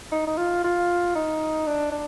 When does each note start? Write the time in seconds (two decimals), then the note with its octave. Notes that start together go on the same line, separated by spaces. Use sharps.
0.12 D#4
0.27 D#4
0.38 F4
0.64 F4
1.16 D#4
1.67 D4
1.92 D4